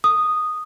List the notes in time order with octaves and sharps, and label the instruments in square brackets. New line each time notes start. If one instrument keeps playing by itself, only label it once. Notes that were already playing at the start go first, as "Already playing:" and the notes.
[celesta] D#6